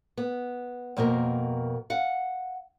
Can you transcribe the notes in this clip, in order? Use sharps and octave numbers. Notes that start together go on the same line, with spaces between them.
B3
F2 B2 A#3 A#4
F5 F#5